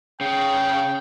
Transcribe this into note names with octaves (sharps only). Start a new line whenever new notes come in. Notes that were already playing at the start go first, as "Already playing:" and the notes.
C#3 G5